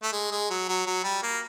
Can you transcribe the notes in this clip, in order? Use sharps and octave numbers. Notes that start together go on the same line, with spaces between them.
A3
G#3
G#3
F#3
F#3
F#3
G3
A#3